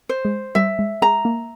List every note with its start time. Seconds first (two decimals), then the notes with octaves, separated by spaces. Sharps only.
0.09 C5
0.25 G#3
0.55 G3 E5
0.79 G#3
1.02 G#3 A#5
1.25 A#3